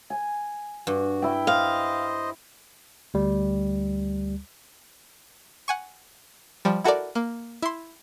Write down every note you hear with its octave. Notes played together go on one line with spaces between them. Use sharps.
G#5
G2 F#4
E4 G5
C5 D#5 F5
D2 G3
F#5 G#5 C#6
F3 G3
E4 F#4 A4 A#4 D5
A#3
E4 C6